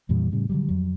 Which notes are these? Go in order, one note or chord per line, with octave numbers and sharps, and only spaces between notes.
F2 A#2 E3 G3
A2 C#3 G3
D3 F#3 G3
F2 F#3